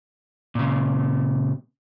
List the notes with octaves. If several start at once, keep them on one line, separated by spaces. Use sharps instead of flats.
A#2 C#3